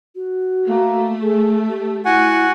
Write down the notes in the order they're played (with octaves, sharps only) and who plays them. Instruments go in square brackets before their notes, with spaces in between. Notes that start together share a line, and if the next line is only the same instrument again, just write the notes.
[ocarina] F#4
[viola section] A3 [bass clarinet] A#3
[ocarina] G#4 [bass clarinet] A4
[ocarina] G4
[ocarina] E4 [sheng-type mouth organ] F#4 F#5 G#5